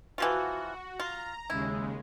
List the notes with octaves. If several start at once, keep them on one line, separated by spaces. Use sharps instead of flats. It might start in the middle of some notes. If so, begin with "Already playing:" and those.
E3 F3 F4 F#4
F4 A#5
D#2 C#3 G#3 E4